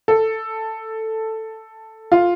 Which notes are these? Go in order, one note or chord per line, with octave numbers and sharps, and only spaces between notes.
A4
F4